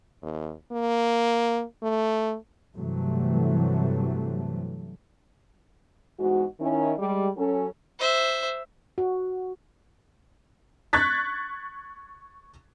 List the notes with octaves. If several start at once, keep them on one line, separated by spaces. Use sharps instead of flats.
D#2
A#3
A3
G2 C3 E3 F#3 A3
E2 G#2 G#3 F#4
D#3 C#4 E4
G3 G#3
F#3 C#4 A4
C5 E5
F#4
C#6 F#6 G#6 A6 B6